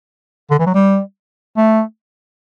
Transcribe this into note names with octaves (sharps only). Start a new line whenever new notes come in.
D3
E3
F#3
G3
A3